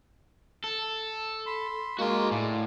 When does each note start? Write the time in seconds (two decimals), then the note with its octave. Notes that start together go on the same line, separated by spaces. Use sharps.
0.64 A4
1.46 B5 C6
1.99 G#3 A#3 F#4 C6
2.31 A2 D5